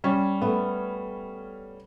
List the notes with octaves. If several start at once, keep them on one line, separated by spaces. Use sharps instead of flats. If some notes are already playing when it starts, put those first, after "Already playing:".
G3 C#4
A3 B3